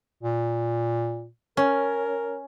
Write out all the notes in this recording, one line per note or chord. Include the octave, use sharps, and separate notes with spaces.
A#2
C#4 A#4